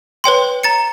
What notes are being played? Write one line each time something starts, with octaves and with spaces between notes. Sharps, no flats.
B4 C#5 G5 C6
A#5 A6 C#7